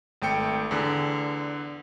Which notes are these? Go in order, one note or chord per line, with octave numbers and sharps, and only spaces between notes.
G#1 A3 G5 C#7
E2 D3